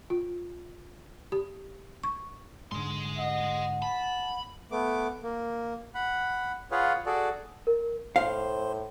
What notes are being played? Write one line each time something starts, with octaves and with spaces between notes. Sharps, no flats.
F4
G4
C#6
G#2 D3 G#4 C6
D#5 F#5
A5 B5
A3 B3 D6
A#3
F#5 B5
F4 G#4 B4 C#5 F5 F#5
F#4 G#4 A4 D5
A#4
A2 C5 F5 C6